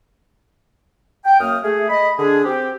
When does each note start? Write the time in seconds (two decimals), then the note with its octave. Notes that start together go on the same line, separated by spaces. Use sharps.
1.24 G5
1.39 F#2 A#3 D#6 F6
1.63 A3 G#4
1.89 D#5 B5
2.17 D3 D4 G#4
2.44 C4 G4